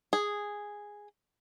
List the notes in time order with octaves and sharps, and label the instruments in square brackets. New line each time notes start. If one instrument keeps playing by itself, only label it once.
[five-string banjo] G#4